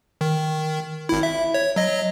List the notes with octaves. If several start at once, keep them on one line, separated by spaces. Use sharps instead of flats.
D#3
G#1 E4
E5
C#5
F#3 D#5